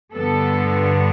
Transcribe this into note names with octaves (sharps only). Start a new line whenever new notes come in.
G2 D3 G3 B3 A4